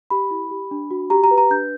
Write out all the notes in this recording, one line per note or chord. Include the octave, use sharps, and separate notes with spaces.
G4 B5
E4
G4
D4
F#4
G4 A#5
A#5
B4
A#5
D4 G6